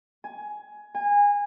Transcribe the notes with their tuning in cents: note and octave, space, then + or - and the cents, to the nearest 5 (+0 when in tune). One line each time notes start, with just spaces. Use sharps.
G#5 +15
G#5 -25